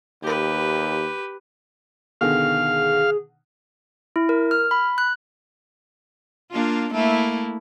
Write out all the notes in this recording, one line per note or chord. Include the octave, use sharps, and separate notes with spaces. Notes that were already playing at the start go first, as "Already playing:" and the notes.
D#2 G4 B4
B2 D3 D#3 G#4 F5
E4
A#4
F6
B5
F#6
A#3 D4 F4
A3 A#3 E4